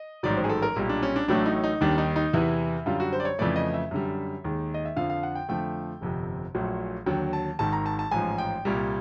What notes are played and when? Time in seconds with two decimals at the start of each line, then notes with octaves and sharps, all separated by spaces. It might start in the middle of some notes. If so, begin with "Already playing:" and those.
Already playing: D#5
0.23 A1 G#2 D#3 F#3 D5
0.37 C5
0.44 G#4
0.49 A4
0.62 A#4
0.76 B1 A#2 G3
0.89 D4
1.03 C#4
1.16 D4
1.28 A1 A2 F#3 A3 D4
1.46 D#4
1.63 D#4
1.81 D#2 D#3 G3 D4
1.98 D#4
2.16 D#4
2.33 E2 C3 E3 E4
2.86 F#2 D3 G3 F4
3.00 F#4
3.13 C5
3.20 D5
3.25 C#5
3.39 F2 C#3 E3 A3 D5
3.56 D#5
3.74 E5
3.91 F#2 D3 G3
4.44 D#2 D#3 G#3
4.74 D#5
4.85 E5
4.96 F2 D3 F3 F5
5.10 F5
5.23 F#5
5.35 G5
5.49 F2 D3 F3 A3 G5
6.01 G1 F2 C3
6.54 A#1 A#2 F#3 A3
7.06 D#2 D3 F#3 G5
7.33 A5
7.59 G#1 G#2 D#3 A5
7.73 A#5
7.86 A5
7.99 A5
8.11 A1 G#2 F3 G#5
8.38 G5
8.65 C2 A#2 G3